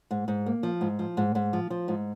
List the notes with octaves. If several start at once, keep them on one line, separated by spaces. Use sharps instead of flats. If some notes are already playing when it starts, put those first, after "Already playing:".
G#2
G#2
A#3
F3
G#2
F3
G#2
G#2
F3
F3
G#2